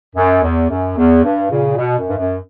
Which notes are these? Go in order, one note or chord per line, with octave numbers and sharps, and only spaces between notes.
F#2
E2
F#2
E2
G2
A#2 C#3
B2
F#2
G2
F#2